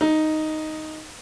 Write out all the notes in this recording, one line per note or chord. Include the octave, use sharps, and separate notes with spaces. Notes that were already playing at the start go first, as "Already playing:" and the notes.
D#4